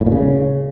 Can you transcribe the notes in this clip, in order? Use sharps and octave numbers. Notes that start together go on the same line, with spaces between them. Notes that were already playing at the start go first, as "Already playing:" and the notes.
A2
A#2
C#3